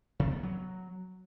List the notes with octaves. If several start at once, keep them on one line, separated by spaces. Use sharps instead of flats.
C3
B3
F#3